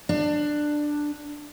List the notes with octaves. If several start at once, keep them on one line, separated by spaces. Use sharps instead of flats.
D4